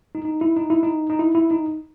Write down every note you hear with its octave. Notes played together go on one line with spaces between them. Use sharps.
D#4
D#4
E4
D#4
E4
D#4
D#4
E4
E4
D#4